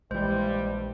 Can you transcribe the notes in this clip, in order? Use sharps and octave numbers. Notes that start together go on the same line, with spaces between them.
A#1 G2 E3 G3 G#3 C5